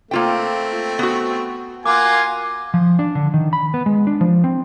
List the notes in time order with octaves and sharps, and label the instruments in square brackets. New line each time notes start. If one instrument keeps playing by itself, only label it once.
[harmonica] A3 C4 [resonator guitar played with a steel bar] A#3 F4 G5
[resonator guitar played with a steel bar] B3 F#4
[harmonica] A#3 F4 F#5 [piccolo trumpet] G#5 [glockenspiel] D6
[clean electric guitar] F3
D4
D3
D#3
B5
B3
G#3
D4
F3
C4